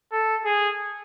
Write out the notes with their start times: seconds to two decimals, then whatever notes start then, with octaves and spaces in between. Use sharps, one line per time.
0.12 A4
0.45 G#4